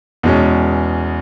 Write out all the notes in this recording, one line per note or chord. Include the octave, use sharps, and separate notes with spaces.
E2 B2 G#3 C#4